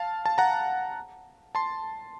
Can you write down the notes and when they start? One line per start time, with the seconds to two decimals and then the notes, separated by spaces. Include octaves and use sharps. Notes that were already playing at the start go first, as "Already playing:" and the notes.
Already playing: F5 A5
0.26 A5
0.38 F#5 A#5
1.55 A5 C6